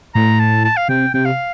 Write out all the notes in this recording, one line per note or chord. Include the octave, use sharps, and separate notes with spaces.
A2 A#5
A5
A5
F5
C3 G5
C3 G5
F5